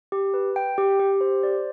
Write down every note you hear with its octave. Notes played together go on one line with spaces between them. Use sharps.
G4
B4
G5
G4
G4
C5
D5